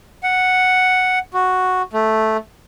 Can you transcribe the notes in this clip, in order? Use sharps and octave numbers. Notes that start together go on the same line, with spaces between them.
F#5
F#4
A3